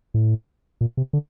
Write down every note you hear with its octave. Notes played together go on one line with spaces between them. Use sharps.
A2
A#2
C3
D3